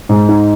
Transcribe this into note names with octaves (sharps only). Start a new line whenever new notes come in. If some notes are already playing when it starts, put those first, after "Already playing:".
G#2
D#4